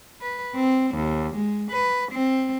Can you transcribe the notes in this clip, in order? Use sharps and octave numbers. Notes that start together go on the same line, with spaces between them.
B4
C4
D#2
G#3
B4
C4